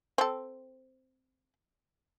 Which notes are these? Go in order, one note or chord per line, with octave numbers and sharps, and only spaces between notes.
C4 A4